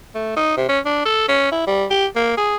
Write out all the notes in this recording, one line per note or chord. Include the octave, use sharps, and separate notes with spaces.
A3
D#4
C3
C#4
D4
A4
C#4
E4
G3
G4
A#3
G#4